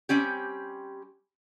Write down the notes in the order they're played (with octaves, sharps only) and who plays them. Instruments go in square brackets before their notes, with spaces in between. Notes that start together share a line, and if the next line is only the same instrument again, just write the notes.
[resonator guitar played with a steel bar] G3 C4 C#4 G4